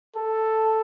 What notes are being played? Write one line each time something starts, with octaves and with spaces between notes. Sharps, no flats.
A4